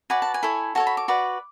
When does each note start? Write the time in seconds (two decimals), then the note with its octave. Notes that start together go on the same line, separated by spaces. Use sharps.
0.10 F#4 B4 D5 G#5
0.22 A5
0.34 G#5
0.43 E4 A4 C#5
0.75 F#4 A4 C#5 A5
0.87 B5
0.97 D6
1.08 F#4 B4 D5